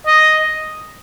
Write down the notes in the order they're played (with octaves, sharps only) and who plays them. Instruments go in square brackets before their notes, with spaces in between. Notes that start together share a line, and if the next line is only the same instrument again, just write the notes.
[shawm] D#5